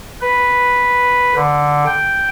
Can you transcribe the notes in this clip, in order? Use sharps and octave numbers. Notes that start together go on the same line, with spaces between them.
B4
D3
G5